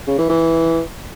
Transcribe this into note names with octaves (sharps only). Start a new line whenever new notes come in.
C#3
E3
E3